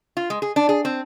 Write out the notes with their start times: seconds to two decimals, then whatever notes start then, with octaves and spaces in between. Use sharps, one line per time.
0.17 F4
0.30 G#3
0.42 G#4
0.56 D4
0.69 G#4
0.85 C4